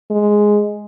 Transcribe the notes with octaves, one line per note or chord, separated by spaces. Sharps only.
G#3